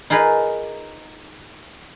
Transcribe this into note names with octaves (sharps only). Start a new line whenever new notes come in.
D#4 F4 G#4 A#4 B4